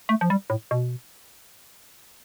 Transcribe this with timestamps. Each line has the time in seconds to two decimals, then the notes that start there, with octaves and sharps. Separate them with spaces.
0.09 A3
0.21 F3
0.30 G3
0.50 A2
0.71 B2